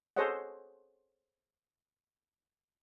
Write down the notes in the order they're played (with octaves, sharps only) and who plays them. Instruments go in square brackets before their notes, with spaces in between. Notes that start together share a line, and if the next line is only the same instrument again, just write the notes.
[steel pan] G#4 A4 C5 C#5 D#5 F#5